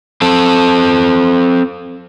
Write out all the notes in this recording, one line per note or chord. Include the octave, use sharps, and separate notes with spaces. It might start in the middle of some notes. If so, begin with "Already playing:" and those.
C4 A4